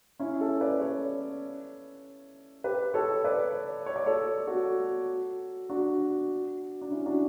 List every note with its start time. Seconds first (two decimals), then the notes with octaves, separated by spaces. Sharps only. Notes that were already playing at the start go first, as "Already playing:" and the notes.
0.20 C#4 E4
0.40 A4 C#5
0.61 B4 D5
0.81 A4 C#5
2.64 G4 B4
2.94 A4 C#5
3.24 B4 D5
3.86 C#5
3.96 D5
4.06 A4 C#5
4.47 F#4 A4
5.70 D4 F#4
6.81 D4
6.91 C#4 E4
7.06 D4 F#4